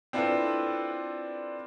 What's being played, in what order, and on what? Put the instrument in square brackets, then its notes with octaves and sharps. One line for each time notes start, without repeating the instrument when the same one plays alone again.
[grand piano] C4 D4 E4 F4 A4 B4